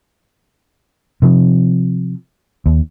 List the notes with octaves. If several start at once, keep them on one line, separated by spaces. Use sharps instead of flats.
C3 F3
D#2